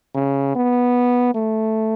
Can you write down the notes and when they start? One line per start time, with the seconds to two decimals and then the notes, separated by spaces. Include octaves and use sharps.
0.15 C#3
0.55 B3
1.34 A3